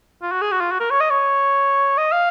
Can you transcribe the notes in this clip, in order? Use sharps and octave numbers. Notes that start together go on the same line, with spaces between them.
F4
F#4
G#4
F#4
F4
F#4
A#4
C#5
D#5
C#5
D#5
F5